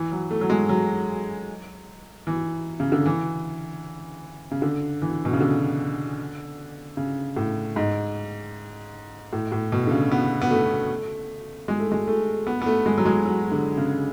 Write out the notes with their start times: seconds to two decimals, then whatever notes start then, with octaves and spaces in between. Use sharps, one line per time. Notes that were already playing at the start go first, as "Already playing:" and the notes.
Already playing: E3
0.12 F#3
0.31 A3
0.41 F#3
0.50 G#3
0.69 F#3
2.27 E3
2.80 C#3
2.92 D3
3.06 E3
4.51 C#3
4.62 D3
5.02 E3
5.25 B2
5.33 C#3
5.40 D3
6.97 C#3
7.36 A2
7.76 G#2
9.33 A2
9.52 A2
9.72 B2
9.87 D3
9.91 C#3
10.11 B3
10.42 B3
10.51 A3
11.68 G#3
11.80 A3
11.92 G#3
12.08 A3
12.47 B3
12.62 B3
12.66 A3
12.86 G#3
12.98 F#3
13.06 G#3
13.25 F#3
13.52 D3
13.77 C#3